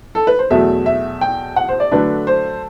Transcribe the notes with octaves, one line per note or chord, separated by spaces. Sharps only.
A4
B4
C5
E2 B2 F#3 A3 E5
E5
G5
F#5
C5
D5
D3 F#3 A3 D4 B4
C5